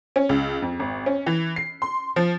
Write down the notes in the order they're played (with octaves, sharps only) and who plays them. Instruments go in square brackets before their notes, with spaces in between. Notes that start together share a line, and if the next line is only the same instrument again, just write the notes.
[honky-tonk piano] C#4
C#2
F2
G#1
C#4
E3
C7
C6
F3